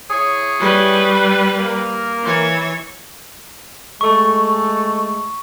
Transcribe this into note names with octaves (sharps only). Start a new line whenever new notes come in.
E4 G#4 C#5
G3 B4
A#3 A#4
E3 C#5
G#3 A3 C#6